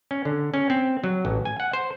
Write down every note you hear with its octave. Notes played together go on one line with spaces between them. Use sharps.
C#4
D3
C#4
C4
F#3
A1
G#5
F#5
C5